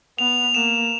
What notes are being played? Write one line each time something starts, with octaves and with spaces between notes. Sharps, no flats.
B3 F7
A#3 E7